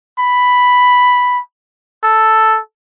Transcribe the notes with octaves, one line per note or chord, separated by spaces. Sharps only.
B5
A4